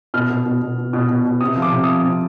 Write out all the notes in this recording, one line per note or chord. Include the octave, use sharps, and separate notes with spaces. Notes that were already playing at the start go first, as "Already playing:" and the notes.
B2 F6
B2
B2
B2
B2
B2
B2
B2
C3 D#6
F3
D6
C3
D#6
F3
C3